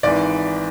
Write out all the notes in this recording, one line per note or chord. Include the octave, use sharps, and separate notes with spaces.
G#1 G#2 E3 D5